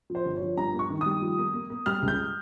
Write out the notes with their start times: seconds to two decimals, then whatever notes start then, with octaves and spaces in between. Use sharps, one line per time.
0.10 F3
0.15 C5
0.25 G1
0.37 F3 C#5
0.57 G2 A#5
0.74 A#3
0.79 C#6
0.90 D#3
1.01 G3 D#6
1.22 F3
1.38 A#3
1.54 A#3
1.70 A#3
1.86 G3 F6
2.02 C#2
2.08 G6